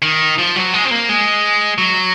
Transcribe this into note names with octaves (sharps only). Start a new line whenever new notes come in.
D#3
F3
F#3
G#3
C4
A#3
G#3
F#3